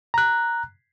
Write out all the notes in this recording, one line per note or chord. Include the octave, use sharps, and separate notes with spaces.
A#5 F#6